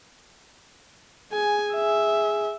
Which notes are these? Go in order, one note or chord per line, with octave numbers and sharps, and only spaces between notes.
G#4 G#5
E5